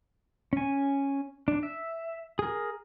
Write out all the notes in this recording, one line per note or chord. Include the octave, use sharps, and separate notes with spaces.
C#4 G#5
D4
E5
G#4 A#4